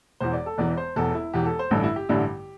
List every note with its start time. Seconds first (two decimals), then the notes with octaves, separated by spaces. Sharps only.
0.20 E1 E2 E3 C5
0.33 D5
0.46 A4
0.58 E1 E2 E3 D5
0.77 C5
0.96 E1 E2 E3 A4
1.15 E4
1.34 E1 E2 E3 G4
1.46 A4
1.59 C5
1.71 A1 G2 D3 G3 E4 A4
1.84 E4
1.96 G4
2.09 A1 G2 D3 G3 E4